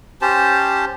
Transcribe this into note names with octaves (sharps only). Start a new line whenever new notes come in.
C#4 G4 C5 A5